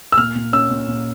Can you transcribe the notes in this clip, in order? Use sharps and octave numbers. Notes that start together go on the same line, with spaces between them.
E6
A#2 F6
A#2
C#4 E6
A#2
A#2